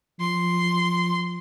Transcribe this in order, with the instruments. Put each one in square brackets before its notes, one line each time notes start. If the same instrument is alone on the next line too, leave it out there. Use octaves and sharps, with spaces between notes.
[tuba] F3 [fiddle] C6